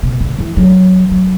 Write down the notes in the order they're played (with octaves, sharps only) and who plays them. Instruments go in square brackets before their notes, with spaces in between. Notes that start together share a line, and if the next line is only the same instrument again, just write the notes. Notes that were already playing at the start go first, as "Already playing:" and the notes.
[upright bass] B2
D3
E3
F#3
F#3